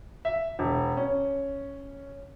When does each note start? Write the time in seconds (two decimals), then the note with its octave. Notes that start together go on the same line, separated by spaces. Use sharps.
0.25 E5
0.59 E1
0.97 C#4